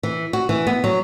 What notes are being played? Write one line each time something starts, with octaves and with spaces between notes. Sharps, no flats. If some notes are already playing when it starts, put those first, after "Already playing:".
E3
F#4
E3
B3
F#3